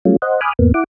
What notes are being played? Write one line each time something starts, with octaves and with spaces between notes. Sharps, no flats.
F#3 G3 A3 C#4 F4
C5 D#5 F#5
G#5 B5 D6 D#6 F6 F#6
E2 G#2 A#3 B3
E4 F#5 D6